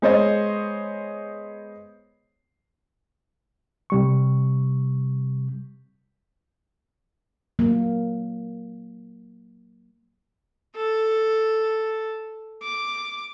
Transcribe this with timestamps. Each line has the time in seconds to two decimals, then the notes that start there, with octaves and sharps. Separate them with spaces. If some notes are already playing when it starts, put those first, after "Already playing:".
0.02 G#3 B3 C5 C#5 D#5
3.90 C3 G3 C#6
7.59 F#3 A#3
10.76 A4
12.63 D6